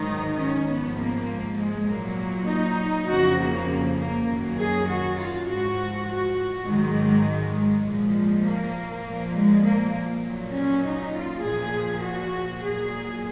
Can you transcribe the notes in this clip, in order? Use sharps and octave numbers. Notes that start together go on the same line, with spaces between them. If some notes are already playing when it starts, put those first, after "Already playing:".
Already playing: G#2 D#3 F#3 D#4
C#4
G#2 F3 B3
A#3
G#3
A#2 F#3 A#3
D#4
F2 C#3 F3 F#4
A#3
A#3
F#2 D#3 F#3
G#4
F#4
F4
G#2 F3 F#4
F#4
G#2 D#3 F#3 G#3
G#3
G#3
A#2 F3
A#3
A#2 F3
G#3
A#3
A#2 F#3
C#4
D#4
F4
A#2 F3 G#4
F#4
A#2 F#3 G#4